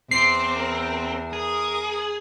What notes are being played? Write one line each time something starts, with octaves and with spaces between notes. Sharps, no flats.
E2 C4 C6 D6 C7
A#4
G#4 A#4 D#6